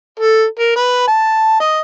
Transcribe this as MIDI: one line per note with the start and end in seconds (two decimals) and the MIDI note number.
0.20 0.44 69
0.59 0.75 70
0.76 1.07 71
1.08 1.55 81
1.60 1.81 75